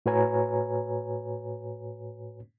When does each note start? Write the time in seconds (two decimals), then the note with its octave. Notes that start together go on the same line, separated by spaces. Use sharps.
0.06 A2 F#4 B4 C#5 G#5 A#5